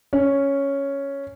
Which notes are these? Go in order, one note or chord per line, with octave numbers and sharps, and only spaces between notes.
C#4